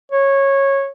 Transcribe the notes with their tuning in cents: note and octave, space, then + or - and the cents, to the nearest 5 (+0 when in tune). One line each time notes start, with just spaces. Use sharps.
C#5 -15